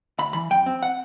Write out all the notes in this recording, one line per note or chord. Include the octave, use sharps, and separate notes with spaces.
D2 B5
E3 B5
F#2 G5
C4
F#5